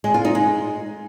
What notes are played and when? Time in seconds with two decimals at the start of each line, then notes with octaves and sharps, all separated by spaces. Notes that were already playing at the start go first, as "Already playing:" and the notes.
0.04 G#3
0.14 F4
0.25 D#4
0.35 G#3